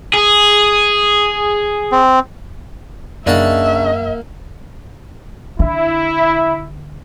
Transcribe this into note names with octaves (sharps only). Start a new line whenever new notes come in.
G#4
C4
F#2 C#3 A#3 D4 D#4 E5 F#5
D3 E4